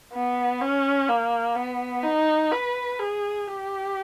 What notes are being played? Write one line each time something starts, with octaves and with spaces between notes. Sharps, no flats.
B3
C#4
A#3
B3
D#4
B4
G#4
G4